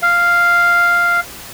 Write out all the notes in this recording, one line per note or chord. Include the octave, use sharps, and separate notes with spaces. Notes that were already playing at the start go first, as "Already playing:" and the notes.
F5